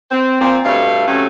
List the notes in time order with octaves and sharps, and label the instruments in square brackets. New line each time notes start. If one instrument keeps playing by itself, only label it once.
[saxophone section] C4
A#2 F3 C4
G2 B2 A3 F5
C3 F#3 A3 C#4